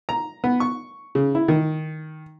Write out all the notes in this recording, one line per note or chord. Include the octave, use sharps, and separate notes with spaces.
A#5
B3
C#6
C#3
E4
D#3